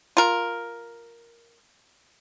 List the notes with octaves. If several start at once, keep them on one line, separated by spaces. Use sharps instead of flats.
F4 A#4